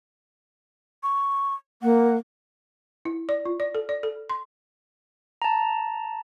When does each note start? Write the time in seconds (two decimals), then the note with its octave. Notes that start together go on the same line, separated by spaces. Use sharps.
1.03 C#6
1.82 A#3 F#5
3.05 E4
3.29 D5
3.45 F4
3.60 D5
3.75 A4
3.89 D5
4.03 A4
4.30 C6
5.42 A5 A#5